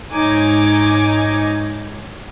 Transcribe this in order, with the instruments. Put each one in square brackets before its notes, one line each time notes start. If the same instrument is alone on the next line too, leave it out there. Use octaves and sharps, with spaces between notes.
[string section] G#2 D#4 C#5 G#5 D6 G#6